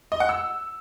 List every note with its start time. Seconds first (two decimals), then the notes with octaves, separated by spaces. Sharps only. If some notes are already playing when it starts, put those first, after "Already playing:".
0.12 D#5
0.20 F#5
0.29 E6